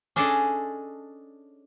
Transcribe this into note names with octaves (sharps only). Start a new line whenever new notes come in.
C#4 D4 G#4 A4 D5 D#5